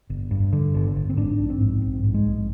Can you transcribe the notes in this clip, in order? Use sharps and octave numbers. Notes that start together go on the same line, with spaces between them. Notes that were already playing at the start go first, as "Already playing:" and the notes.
G1
G2
D3
G1
G1
C4
G#2 D4
A#1
C4
G#2
A#1 C4
G#2
G#3
A#1